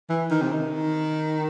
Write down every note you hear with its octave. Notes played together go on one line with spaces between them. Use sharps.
E3
D#3
C3
D#3